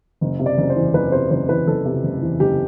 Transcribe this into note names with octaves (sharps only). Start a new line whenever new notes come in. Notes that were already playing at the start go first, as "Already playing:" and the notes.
F#1
C3
D5
F#1
C5
E2
F#1 B4
C3 C5
F#1 C5
E2 B4
F#1 A4
C3
F#1
E2
F#1 G4